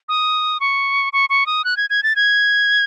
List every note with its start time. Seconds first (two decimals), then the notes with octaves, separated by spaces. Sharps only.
0.09 D#6
0.60 C#6
1.13 C#6
1.30 C#6
1.46 D#6
1.64 F#6
1.77 G#6
1.90 G#6
2.03 A6
2.16 G#6